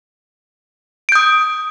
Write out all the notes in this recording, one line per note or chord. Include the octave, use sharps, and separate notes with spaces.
D#6 G6 D7